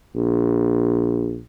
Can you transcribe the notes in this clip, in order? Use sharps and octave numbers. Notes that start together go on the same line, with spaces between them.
A#1